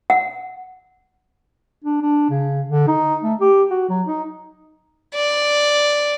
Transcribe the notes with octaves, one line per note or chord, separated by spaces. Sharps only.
F#5
D4
D4
C#3
D3
D#4
A3
G4
F#4
F#3
D#4
D5